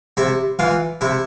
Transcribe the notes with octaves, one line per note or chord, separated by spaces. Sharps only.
C3 E4 E5
E3 F4 F5
C3 E4 E5